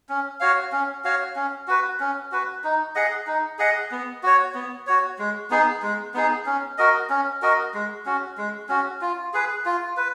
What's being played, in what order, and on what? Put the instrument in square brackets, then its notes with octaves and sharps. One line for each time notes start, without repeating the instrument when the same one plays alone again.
[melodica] C#4
F#4 C#5 F5
C#4
F#4 C#5 F5
C#4
F#4 B4
C#4
F#4 B4
D#4
G#4 D#5 F#5
D#4
G#4 D#5 F#5
B3
F#4 C#5
B3
F#4 C#5
G#3
B3 D#4 G#4
G#3
B3 D#4 G#4
C#4
F#4 A#4 D#5
C#4
F#4 A#4 D#5
G#3
C#4 F#4
G#3
C#4 F#4
F4
G#4 B4
F4
B4